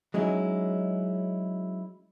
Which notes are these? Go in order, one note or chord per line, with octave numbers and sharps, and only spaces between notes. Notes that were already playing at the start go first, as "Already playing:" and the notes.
F#3 G#3 C#4 D#4 E4